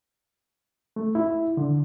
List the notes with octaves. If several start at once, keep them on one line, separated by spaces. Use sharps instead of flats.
A3
E4
D3